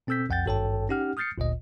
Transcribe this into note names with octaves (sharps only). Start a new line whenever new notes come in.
B2 C4 A4 E6 G6 B6
B1 F2 F#5 G5 G6 A6
G#1 G2 A4 C#5 G5 A5
C#4 D#4 G4 F#5 F6
D#6 F6 G6 A6 C7 C#7
G1 D2 A#2 D#5